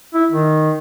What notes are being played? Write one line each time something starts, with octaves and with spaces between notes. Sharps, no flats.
E4
D#3